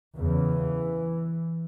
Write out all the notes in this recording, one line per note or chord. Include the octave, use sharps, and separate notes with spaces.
E2 C#3 E3